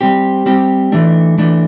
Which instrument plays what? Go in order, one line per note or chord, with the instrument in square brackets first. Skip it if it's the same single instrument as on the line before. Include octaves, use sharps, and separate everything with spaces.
[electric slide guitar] G3 C4 G4
G3 C4 G4
E3 A3 D4
E3 A3 D4